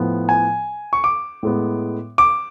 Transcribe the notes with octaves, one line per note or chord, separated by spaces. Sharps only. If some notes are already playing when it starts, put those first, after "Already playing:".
Already playing: A2 F3 B3
G#5
C#6
D6
A2 G#3 B3
D6